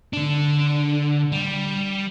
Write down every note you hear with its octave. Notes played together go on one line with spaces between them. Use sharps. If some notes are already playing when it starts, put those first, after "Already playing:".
D3 D4
G3